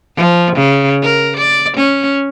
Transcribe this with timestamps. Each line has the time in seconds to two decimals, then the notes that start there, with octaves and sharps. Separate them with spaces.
0.16 F3
0.56 C#3
1.03 A#4
1.37 D5
1.77 C#4